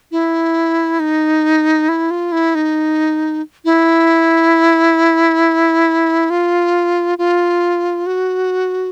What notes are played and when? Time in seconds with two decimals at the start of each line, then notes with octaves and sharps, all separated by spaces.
0.12 E4
1.00 D#4
1.89 E4
2.11 F4
2.32 E4
2.55 D#4
3.65 E4
6.30 F4
7.18 F4
8.06 F#4